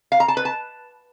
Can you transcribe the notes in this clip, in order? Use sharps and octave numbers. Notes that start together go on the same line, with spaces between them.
F5
A#5
A5
B4
A5